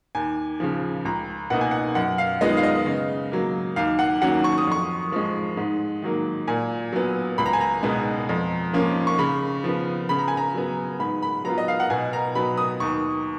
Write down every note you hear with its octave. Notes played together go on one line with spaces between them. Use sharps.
D#2 G#5
C#3 F3
C#2 A#5
B2 A#3 D#4 F#5
G#5
F#5
F#2 F#5
F5
D#3 G#3 B3 F4 D#5
F5
D#5
C#3
F#3 A#3
D#2 F5
F#5
D#3 F#3 A#3 C#4 F#5
C#6
D#6
F2 C#6
F3 G#3
G#2
D#3 F#3 A#3
A#2 G#5
F#3 B3
C#2 B5
A#5
G#5
A#5
B2 G#3 B3
F2
F3 A#3 C#4
C#6
C#3 B5
F3 B3
C#3 B5
A#5
G#5
A#5
F#3 B3
G#2 B5
B5
F#3 B3 F4 A#5
D#5
F5
F#5
B2 G#5
A#5
F#3 B3 B5
D#6
D#2 C#6